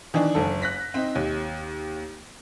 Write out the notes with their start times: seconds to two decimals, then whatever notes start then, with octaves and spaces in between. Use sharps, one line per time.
0.14 D#3 E3 D4
0.35 F#1 A4
0.62 F#6 A#6 B6
0.94 C4 D#4
1.15 D#2